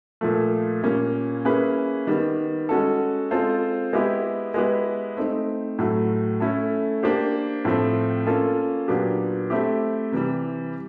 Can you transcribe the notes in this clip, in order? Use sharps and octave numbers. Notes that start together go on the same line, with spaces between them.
A#2 F3 A3
A#2 G3 A#3 C#4
A#3 C#4 E4 G#4 B4
D#3 G3 B3
G#3 C#4 F#4 A4
G#3 C4 F4 A4 C5
G#3 B3 E4 G4
G#3 B3 E4 G4 B4
A3 C4 D#4
A2 F#3 A3
A3 C#4 E4 A4
A#3 D4 G4 C5
A2 F3 A3 C4
A#3 C#4 F4 A4
A#2 F#3 B3 D4 G4
A3 C4 E4 G4
C3 E3 G3